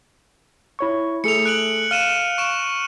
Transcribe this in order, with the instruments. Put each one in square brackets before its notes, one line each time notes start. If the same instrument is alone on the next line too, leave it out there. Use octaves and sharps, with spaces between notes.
[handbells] E4 C#5 C#6
[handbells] A3 G#4 A4 [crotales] C#7 F7
[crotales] F#6 D7 F#7
[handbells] F5 [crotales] F6 D#7 E7
[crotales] C#6 D7 E7